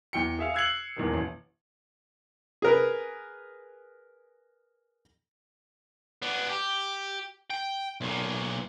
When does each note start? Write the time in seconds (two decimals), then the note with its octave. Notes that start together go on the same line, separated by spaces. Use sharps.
0.13 E2 G5 C#7
0.39 G#4 E5 F5
0.54 E6 F#6 G#6 C7 C#7 F#7
0.96 E1 E2 A#2 D#3
1.14 A1
2.62 G#4 A#4 B4
6.22 B3 D4
6.48 G4
7.50 G5
8.01 B1 A#2